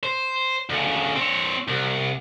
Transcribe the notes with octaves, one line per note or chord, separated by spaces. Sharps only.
C5
D2 C#3
C4 C#5
C2